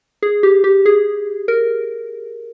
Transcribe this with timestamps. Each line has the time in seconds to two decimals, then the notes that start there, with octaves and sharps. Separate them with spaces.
0.22 G#4
0.43 G4
0.64 G4
0.86 G#4
1.48 A#4